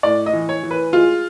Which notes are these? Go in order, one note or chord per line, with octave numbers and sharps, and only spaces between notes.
A2 D5
D#5
E3
C#5
E3
B4
G#3 F4